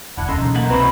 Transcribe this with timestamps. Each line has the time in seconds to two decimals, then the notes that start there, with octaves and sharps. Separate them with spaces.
0.17 E1 D2 D4 E4 F#5
0.29 C#3 A4 D#5 C6
0.41 B2 E3 F#3 D#4
0.55 A3 A#3 F#5
0.70 C2 C3 C4 D#4 E4 F#4 B4 C5